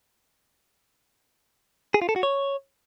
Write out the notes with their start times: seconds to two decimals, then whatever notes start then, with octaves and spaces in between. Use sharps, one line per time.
1.94 G#4
2.02 F4
2.09 A4
2.16 F#4
2.23 C#5